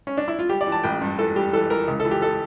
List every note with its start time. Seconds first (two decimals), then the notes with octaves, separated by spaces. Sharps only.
0.07 C#4
0.17 D4
0.28 E4
0.39 F4
0.49 G3 G4
0.61 D5
0.67 E3
0.72 A5
0.83 A1 G5
1.01 G2
1.19 E3 A4
1.36 G3 G4
1.53 E3 A4
1.70 E3 A#4
1.88 C#2
2.00 A4
2.05 E3
2.11 G4
2.22 A4